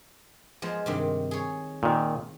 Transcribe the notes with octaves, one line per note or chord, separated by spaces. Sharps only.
F3 G#3 B3
G2 C3 D#3
G#4 C#5
A#2 D#3